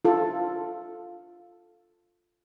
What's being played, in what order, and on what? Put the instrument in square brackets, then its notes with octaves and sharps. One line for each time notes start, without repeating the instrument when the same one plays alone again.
[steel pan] F4 A4